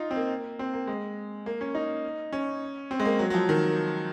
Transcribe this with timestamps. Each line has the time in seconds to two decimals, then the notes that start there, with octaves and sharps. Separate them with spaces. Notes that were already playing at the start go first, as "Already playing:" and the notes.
Already playing: D#4 F4
0.11 C4
0.16 A#3
0.59 C4
0.73 A#3
0.87 G#3
1.46 A#3
1.61 C#4
1.75 D#4
2.32 C#4
2.91 C4
3.00 G#3
3.05 A#3
3.19 F#3
3.30 F#3
3.34 F3
3.49 D#3